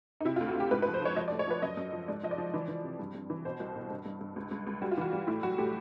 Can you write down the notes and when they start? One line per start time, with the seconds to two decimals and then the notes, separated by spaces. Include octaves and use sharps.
0.20 D#4
0.25 C3 E4
0.36 F4
0.41 D2
0.48 F#4
0.55 D2 G4
0.71 G#2 B4
0.82 B4
0.86 F3
0.94 C5
1.02 F3 C#5
1.16 F3 D#5
1.28 D5
1.32 A2
1.39 C#5
1.47 F3 B4
1.62 F#2 D#5
1.77 F#2
1.93 F3
2.08 G#2 D5
2.23 F3 D#5
2.31 D5
2.38 F3
2.54 E3
2.68 E3
2.84 C3
2.99 G2
3.15 G2
3.30 E3
3.45 B2 C5
3.60 C2
3.75 B2
3.91 G2
4.06 G2
4.21 G2
4.36 C#2
4.51 C#2
4.67 C#2
4.82 G3 F#4
4.91 F4
4.97 E3 F#4
5.13 G3
5.27 A2 E4
5.43 F#3 F#4
5.58 A2 G4